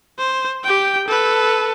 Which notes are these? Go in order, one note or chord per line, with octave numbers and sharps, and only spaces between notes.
C5
G4 G5
A4 B4